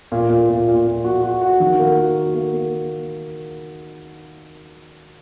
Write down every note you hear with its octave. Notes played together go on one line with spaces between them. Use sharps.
A#2
A#2
A#2
A#2
A#2
F#4
F#4
F#4
D#3
A#3
F#4
A#3
A#3
A#3